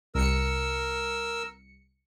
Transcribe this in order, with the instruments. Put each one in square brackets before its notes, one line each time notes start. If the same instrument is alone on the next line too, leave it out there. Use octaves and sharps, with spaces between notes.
[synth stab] C2 C#7 [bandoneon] A#4 E6